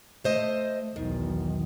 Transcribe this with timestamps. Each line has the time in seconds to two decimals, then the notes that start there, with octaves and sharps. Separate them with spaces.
0.24 A3 C5 D#5
0.96 B1 E2 D#3